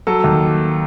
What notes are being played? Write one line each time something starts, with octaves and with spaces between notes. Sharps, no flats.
F#3 A4
D#2